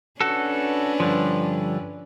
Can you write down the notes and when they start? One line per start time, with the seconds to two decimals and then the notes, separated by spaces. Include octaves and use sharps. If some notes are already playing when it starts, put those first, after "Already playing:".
0.21 C#4 D4 F#4 A4 B4
1.00 G2 D3 F3